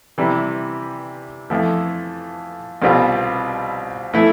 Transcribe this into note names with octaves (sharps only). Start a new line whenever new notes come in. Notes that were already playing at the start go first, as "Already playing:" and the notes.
C3 E3 G3
F2 E3 A3
C2 B2 G3 C4 F4
E3 A3 E4